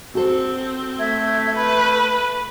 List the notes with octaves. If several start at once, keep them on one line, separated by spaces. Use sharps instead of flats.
C4 F#4 A4 C5
A3 E5 G#6
B4 B5